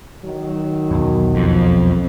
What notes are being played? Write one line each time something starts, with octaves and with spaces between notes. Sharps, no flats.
D#3 F#3
B1 E2
F2